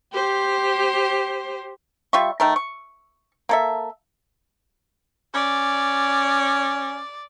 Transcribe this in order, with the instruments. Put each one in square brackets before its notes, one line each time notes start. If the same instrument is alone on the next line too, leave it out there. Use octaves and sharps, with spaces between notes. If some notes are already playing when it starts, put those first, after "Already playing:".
[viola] G4 C5
[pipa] G3 F4 E5 C#6
D#3 A3 A#4
C#6
A#3 A4 E5
[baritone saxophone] C#4 [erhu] D5